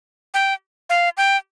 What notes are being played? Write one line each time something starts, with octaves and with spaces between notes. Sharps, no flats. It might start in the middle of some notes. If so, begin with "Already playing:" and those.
G5
F5
G5